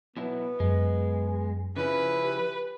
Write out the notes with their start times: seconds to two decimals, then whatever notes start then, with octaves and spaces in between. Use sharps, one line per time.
0.17 B2 F#3 B3 E4
0.60 F#2 F#3 G#3
1.76 C#3 F3 C#4 E4 B4
2.24 G4